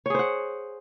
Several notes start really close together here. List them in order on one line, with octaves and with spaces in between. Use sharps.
C#5 G#4 C5 F#5